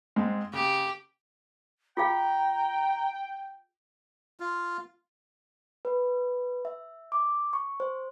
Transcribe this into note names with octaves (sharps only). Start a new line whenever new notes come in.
G#2 G#3 C4
C#3 G4
F4 G#4 F5 G5 A#5
F4
B4
E5
D6
C#6
C5